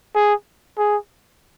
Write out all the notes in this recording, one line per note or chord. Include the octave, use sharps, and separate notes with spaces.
G#4
G#4